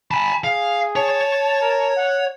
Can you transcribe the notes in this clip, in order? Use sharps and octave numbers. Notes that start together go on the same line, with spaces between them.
G#5 A5 B5
G#4 F5
C#5 A5
A#4
F#5